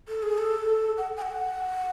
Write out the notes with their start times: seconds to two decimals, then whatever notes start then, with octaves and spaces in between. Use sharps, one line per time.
0.08 A4
0.22 G#4
0.38 A4
0.98 F#5
1.17 G#5
1.22 F#5